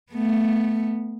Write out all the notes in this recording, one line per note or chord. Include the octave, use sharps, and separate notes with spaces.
A3 B3